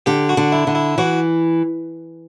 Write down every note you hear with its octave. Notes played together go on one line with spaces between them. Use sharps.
D3 G4
F#4
D3
E4
D3
E4
E3 F#4